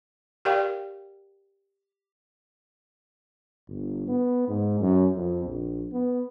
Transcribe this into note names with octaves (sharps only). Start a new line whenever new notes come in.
G4 A#4 D5 F5 G5
G1
B3
G#2
F#2
F2
A#1
B3